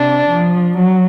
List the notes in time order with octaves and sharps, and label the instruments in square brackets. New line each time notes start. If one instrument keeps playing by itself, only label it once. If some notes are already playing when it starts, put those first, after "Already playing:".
Already playing: [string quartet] C3 [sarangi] D4
[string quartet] F3
F#3